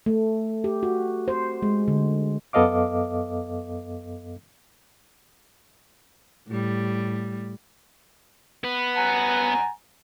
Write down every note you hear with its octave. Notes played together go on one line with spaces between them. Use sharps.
A3
G4
F#4
C5
G#3
D3
F#2 B3 A4 D#5 F5 D6
A2 G3
B3 B4
F#5 G#5 A#5